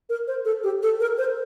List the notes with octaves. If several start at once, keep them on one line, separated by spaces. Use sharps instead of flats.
A#4
C5
A4
G4
A4
A#4
C5